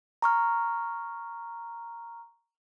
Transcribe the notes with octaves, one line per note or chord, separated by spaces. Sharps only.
A#5 C#6 F6